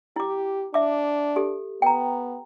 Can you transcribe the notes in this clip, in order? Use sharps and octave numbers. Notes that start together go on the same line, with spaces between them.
E4 G4 D6
D4 E5 D6
G4 A4
B3 G5 A#5